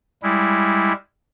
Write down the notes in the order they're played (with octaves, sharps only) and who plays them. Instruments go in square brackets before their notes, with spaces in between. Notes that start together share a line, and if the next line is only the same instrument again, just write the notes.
[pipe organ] G3 G#3 E4